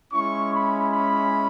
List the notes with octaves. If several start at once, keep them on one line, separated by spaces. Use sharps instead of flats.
G#3 C#4 E4 C#6
B5
B5